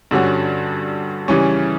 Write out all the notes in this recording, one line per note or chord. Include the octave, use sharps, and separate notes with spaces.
G2 D3 G3 C#4 F#4
C#3 E3 G3 C#4